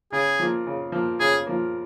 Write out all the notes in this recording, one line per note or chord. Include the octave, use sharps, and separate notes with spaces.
C#3 G#4
F3 A#3
C#3
F3 A#3
C#3 G#4
F3 A#3